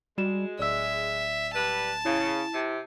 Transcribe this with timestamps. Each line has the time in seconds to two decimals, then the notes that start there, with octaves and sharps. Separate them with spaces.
0.18 G3 G#3 F#4 E7
0.59 D1 D5 E5 E6
1.54 G3 B4 A5
2.05 C#3 E4
2.54 C3